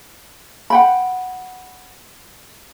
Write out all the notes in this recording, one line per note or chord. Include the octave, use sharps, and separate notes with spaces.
F#5 G5 B5